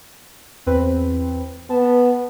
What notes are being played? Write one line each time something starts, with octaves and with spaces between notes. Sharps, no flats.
E2 C4 B4
B3 A5